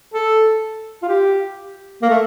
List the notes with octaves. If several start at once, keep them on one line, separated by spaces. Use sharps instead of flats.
A4
F4
G4
A#3
A3